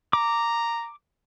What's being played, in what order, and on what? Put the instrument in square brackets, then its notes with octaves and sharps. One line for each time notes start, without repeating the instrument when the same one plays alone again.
[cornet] A#5 [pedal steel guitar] D6